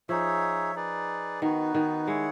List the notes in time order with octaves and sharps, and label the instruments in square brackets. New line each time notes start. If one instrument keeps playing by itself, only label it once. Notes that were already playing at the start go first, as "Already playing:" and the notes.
[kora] F3 [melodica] D#4 G#4 C#5 E5
[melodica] D#4 G#4 B4 D5
[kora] D#3 [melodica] B3 D#4 F#4 B4
[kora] D#3
[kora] G#3 [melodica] E4 G#4 C#5 F#5